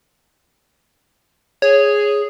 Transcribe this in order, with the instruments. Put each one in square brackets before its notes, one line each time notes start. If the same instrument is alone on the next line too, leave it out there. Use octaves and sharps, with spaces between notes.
[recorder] G#4 [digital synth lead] C#5